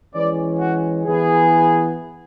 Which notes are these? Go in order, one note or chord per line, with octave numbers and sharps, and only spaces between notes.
E3 G#3 C#4 B4 D5
F#4
E3 B3 E4 G#4